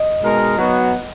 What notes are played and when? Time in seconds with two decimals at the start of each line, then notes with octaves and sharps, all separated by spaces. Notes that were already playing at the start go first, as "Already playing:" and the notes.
Already playing: D#5
0.22 B2 G#3 D#4 A#4
0.57 F#3 B3 D#4 F#4